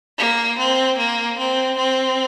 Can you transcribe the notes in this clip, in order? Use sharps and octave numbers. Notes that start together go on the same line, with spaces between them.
A#3
C4
A#3
C4
C4